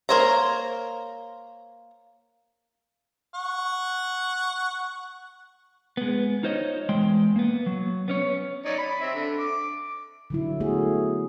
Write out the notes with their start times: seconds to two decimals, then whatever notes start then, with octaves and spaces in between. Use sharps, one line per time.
0.09 A#3 A#4 C5 C#5 A#5
3.34 F#5 C#6
5.97 G#3 B3
6.43 D#4 F4 C5 C#5 D#5
6.89 E2 G#3 G5 C6
7.36 A#3 B3
7.66 F#3
8.08 B3 C#4 C#5
8.65 D#4 C#5 D5
8.78 B5
9.00 C4 E5
9.15 D3
9.39 D6
10.30 D3 F#3 E4
10.60 A3 B3 F#4 G#4